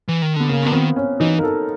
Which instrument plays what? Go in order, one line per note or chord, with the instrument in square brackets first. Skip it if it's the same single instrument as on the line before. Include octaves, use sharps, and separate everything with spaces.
[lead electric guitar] E3
D#3
[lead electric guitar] D3 [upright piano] B3
[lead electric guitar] C#3 [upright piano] A#3
[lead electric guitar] D3 [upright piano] B3
[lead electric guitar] D#3 [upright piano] C4
[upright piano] C#4
[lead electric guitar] E3 [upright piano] D#4
[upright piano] A#4
A4